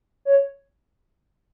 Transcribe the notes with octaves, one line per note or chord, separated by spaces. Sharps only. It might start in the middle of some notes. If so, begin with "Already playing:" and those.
C#5